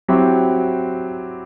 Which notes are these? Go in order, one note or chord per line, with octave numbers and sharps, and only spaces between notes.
F#3 C4 E4 G4